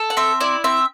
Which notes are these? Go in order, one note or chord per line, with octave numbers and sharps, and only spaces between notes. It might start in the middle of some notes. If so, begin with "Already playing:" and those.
Already playing: A4
F#5
C4 E5
E4 D5
C4 E5